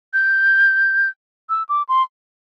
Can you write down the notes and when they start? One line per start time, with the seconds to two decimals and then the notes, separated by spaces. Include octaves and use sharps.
0.14 G6
1.50 E6
1.69 D6
1.89 C6